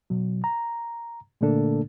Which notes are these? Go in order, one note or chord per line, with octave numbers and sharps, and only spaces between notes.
B2 F#3
A#5
A#2 D3 A3 A#3 D4 A4